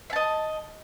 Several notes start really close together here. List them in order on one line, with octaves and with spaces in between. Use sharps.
E5 A5 D#5